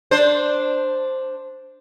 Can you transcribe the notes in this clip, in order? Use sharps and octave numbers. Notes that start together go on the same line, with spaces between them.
D4 C5